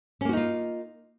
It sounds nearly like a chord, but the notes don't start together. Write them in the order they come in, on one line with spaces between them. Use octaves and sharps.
C#4 A#3 F#4 D#4 F4